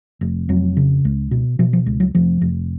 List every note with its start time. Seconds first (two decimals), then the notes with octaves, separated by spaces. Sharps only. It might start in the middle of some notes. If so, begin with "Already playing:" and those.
0.21 F1
0.49 F2 F#3
0.77 C#3
1.05 C#2
1.31 B2
1.59 B2 F3
1.73 F3
1.86 C#2
2.00 F#3
2.15 F1 F3
2.41 F1